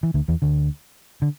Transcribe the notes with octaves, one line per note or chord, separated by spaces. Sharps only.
E3
D2 D3
E2 E3
D2 D3
D3